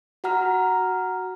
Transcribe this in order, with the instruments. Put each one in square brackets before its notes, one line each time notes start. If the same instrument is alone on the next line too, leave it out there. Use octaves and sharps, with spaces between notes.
[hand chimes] F#4 F#5 A#5 F6